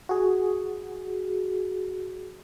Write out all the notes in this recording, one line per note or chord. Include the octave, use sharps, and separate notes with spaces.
F#4 G#4